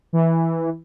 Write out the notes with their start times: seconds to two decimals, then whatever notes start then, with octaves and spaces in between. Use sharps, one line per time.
0.13 E3